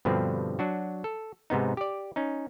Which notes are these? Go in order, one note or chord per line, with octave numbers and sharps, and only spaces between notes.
G2 B2 D3 F3 C4
F#3 D4 F#4
A4
G#2 C3 B3 D#4
G4 D5
C#4 D#4